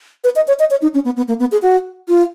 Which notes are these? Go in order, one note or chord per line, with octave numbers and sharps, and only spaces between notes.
B4
D#5
C#5
D#5
C#5
D#4
C#4
B3
B3
A#3
B3
G#4
F#4
F4